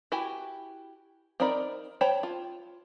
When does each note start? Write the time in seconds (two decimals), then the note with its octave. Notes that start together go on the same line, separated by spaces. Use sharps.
0.12 E4 F#4 G4 G#5
1.40 C4 D#4 A#4 D5 B5
2.01 C5 C#5 G5 A5 B5
2.23 F4